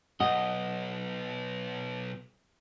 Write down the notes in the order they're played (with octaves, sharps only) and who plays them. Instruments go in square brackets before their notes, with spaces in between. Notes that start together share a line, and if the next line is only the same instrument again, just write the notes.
[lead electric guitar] B1 [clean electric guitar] D#5 [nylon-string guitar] F#5